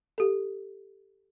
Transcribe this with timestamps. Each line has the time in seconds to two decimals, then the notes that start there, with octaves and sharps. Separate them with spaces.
0.18 G4 A4